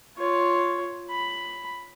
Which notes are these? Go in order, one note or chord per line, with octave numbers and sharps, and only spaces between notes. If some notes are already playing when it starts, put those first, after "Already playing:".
F4 C#5
B5